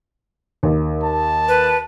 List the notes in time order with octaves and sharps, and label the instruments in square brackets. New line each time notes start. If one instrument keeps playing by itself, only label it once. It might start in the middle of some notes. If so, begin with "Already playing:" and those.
[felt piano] D#2
[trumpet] A5
[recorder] B4